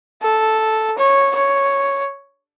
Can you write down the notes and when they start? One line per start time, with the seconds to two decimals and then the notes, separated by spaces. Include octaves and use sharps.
0.22 A4
0.98 C#5
1.35 C#5